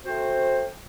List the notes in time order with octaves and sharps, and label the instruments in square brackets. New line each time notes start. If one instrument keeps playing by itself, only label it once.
[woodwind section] A3 C4 F#4 C5